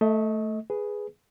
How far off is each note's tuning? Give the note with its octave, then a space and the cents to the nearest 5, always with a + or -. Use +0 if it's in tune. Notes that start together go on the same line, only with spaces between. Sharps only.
A3 +0 D#5 +35
G#4 +0 B4 +0